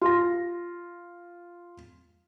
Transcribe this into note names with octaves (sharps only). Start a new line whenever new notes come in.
F4 A#6